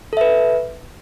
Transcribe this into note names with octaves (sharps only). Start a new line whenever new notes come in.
A4 B4 E5